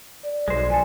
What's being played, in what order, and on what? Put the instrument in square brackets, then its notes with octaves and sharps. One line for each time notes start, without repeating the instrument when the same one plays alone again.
[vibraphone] D5
[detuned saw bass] B1 [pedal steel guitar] G#3 C5
[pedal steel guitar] F3 A4 [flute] G#5